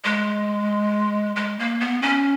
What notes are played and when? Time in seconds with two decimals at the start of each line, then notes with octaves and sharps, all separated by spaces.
0.04 G#3
1.36 G#3
1.59 A#3
1.80 B3
2.02 C#4